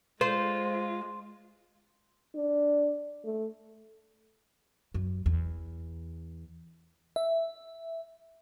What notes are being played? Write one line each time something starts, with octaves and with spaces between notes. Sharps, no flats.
G#3 F4 C5 C6
D4
A3
F#2
E2
E5